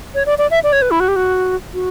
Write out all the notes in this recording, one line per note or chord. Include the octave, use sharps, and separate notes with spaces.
C#5
D5
D5
E5
D5
C#5
B4
E4
F#4
G4
F#4
F#4